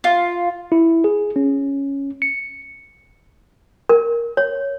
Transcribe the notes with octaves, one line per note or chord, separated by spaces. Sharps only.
F4
E4
G#4
C#4
C#7
A#4
C#5